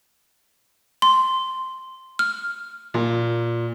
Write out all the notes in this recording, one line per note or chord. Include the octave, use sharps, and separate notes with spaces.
C6
F6
A#2